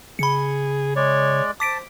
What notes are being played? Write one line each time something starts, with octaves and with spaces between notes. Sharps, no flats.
C#3 G#4 B5 C#7
G#3 C#5 D5
C5 A5 D6 B6 D7